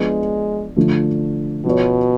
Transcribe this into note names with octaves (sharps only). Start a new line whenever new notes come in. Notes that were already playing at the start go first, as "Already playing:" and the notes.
Already playing: F3 G#3 B3 D4 F4
D3 F3 A3
B2 F3 B3 F#4 C#5